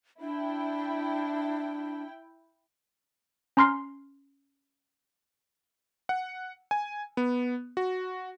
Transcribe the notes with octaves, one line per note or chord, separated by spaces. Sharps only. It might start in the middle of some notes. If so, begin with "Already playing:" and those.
D4 E4 G5
C#4 A#5 C6 F6 C7
F#5
G#5
B3
F#4